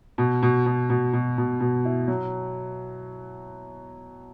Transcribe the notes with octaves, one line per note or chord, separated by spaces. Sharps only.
B2
B2
B2
B2
B2
B2
B2
E4
F#3